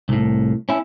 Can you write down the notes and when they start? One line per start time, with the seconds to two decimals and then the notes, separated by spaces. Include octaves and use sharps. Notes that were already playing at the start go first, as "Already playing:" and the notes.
0.09 C2 A2
0.69 C#4 E4